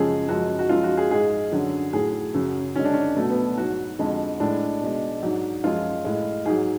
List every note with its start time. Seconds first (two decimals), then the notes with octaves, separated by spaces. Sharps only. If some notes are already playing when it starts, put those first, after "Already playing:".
Already playing: F#2 C#3 F3 G#3 G#4
0.28 F#2 F3 G#3 F#4
0.59 F#4
0.69 F#2 F3 G#3 F4
0.83 F#4
0.97 G#4
1.11 G#2 G#3 G#4
1.52 F#2 D3 F#3
1.93 A2 F#3 G#4
2.34 F#2 C#3 F#3
2.76 F#2 D3 G#3 C#4
2.85 D4
2.93 C#4
3.16 B2 F#3 A3
3.30 B3
3.58 G#2 F#3 F#4
3.99 F2 D3 F3 G#3
4.40 A2 G#3 D4
4.81 B2 G#3
5.22 G#2 F#3
5.64 F#2 F3 G#3 F4
6.05 A2 G#3
6.46 G#2 F#3 G#4